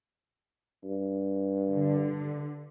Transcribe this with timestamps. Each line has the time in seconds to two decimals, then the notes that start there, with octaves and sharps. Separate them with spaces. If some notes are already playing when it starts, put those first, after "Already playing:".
0.84 G2
1.70 D3